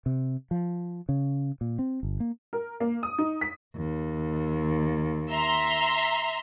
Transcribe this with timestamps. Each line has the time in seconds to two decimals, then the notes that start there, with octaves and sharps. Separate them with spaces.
0.06 C3
0.51 F3
1.09 C#3
1.61 A#2
1.79 C4
2.03 G1
2.20 A#3
2.53 A#4
2.80 A#3
3.03 D#6
3.18 D#4
3.41 B6
3.76 D#2
5.31 E5 A#5 C6